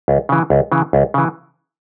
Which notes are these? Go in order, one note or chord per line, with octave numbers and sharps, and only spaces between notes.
C#2
C#3 E3
C#2
C#3 E3
C#2
C#3 E3